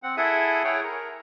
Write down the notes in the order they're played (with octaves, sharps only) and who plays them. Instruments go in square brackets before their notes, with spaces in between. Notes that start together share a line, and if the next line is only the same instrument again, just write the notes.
[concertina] C4 F#5
E4 G#4 A4 E5 F#5 D#6
E4 G#4 C#5 F#5 G5
A#4